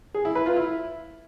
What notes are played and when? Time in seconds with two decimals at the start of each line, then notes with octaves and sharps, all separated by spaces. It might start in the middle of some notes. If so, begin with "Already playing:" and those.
0.14 G#4
0.25 E4
0.35 B4
0.46 F4
0.56 E4